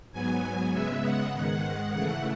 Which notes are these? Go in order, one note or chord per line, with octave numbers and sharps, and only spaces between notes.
G#2 F#3 B3 G#5
C#3 G#3 B3 E5
F#5
G#2 D#3 G#3 F#5
C#3 E3 A3 F#5